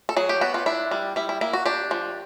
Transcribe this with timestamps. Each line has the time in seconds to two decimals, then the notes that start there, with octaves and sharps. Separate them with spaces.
0.09 A4
0.16 F#3 G#4
0.29 G4
0.41 B3 F#4
0.54 F4
0.66 D4 E4
0.91 G3
1.16 G3 E4
1.29 E4
1.41 A#3 E4
1.53 F#4
1.66 D4 G4
1.91 F3